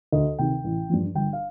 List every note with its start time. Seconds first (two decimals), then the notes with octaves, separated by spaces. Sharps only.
0.12 D2 D#5
0.39 C3 D#3 G5
0.64 A1
0.90 G2 F3
1.15 G1 G5
1.33 F5